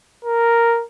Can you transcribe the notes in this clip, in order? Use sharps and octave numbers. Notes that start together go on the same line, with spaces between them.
A#4